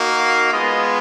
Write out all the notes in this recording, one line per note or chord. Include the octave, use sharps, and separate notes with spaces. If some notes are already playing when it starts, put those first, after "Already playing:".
Already playing: A#3 D#4 F#4
F5
G#3 B3 F4 D#5